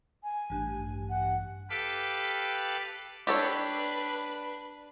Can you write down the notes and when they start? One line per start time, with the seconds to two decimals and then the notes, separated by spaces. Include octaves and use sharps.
0.23 G#5
0.50 A1 G2
1.10 F#5
1.70 G4 A4 B4 F5 B5 D6
3.27 D4 G4 A4 B4 C#5